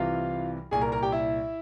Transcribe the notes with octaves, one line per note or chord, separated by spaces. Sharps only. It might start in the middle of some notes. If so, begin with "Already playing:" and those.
Already playing: C2 C3 E3 F4 F5
C2 A#2 G#4 G#5
A#4 A#5
A#4 A#5
G4 G5
E4 E5